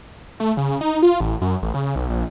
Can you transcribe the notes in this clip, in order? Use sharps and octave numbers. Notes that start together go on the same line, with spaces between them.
A3
C#3
D#4
F4
A1
F#2
A1
C#3
B1
A#1